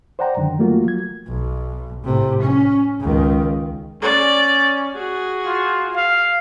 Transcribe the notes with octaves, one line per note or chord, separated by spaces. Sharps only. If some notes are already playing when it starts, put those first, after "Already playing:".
C5 D5 F#5 G5 A#5
F#2 D3 D#3
F3 F#3 A3 A#3 F4 F#4
G#6
B1
A2 C3
C#4
C#2 D#3
C#4 D5
F#4 G#4
F4
F5